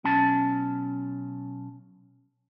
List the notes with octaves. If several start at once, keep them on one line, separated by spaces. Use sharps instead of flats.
B1 C#4 A5